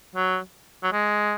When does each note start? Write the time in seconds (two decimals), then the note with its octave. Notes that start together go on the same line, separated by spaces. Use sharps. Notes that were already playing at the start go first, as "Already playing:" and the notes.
0.15 F#3
0.83 F#3
0.92 G#3